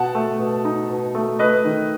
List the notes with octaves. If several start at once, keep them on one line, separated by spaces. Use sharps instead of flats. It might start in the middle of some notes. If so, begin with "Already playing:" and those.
Already playing: B2 F#5 A5
A3
B2
D#4
B2
A3
A3 B4 D#5
D#3